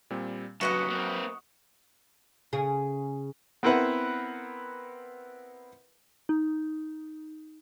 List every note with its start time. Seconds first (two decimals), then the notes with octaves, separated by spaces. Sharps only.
0.10 A#2 G3 C4
0.61 G2 C#3 F#3 F#4 B4 D#5 F#5
0.90 A#3 C4
2.53 C#3 G#4
3.63 B3 C4 E4 A#4 B4 F#5
6.29 D#4